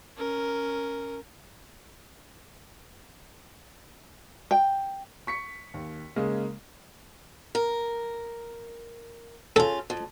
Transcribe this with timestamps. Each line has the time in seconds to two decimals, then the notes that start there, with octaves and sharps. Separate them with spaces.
0.17 C#4 A#4
4.51 G5
5.27 C#6 B6 C#7
5.74 D#2
6.16 C#3 G#3 A#3
7.55 A#4
9.56 C#3 F4 A4
9.90 F2